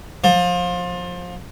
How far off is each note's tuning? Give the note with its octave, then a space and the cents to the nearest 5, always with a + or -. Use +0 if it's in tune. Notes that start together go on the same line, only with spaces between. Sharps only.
F3 +25